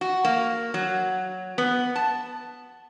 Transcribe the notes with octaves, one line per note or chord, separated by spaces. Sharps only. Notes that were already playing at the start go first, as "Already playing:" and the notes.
F#4
A#3
F#3
B3
A5